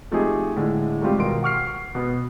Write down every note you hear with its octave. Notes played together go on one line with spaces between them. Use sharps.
F3 A3 C4 D#4 G4 G#4
A2 D3 G#3
G#2 G3 A3 C4 F4 G4
G#1 B2 F4 A#4 C6 D7
F#5 C#6 F6 C7
B2 B3